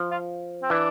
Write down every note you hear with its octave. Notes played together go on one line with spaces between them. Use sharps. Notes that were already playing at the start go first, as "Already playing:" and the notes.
Already playing: F3
F4
C4
E3 D4